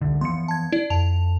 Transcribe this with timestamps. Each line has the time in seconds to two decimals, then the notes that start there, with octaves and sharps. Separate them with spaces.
0.01 C2 D3
0.21 E3 F3 B3 C6 C#7
0.48 A5 G#6
0.72 E4 D5
0.90 F2 A5 F7